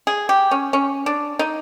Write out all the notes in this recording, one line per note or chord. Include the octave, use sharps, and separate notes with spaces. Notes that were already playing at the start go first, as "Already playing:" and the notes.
G#4
G4
C#4
C#4
D4
D#4